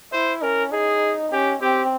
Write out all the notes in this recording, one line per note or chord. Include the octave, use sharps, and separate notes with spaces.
E4 C5
C#4 A#4
D#4 G#4
C#4 G4
C4 G4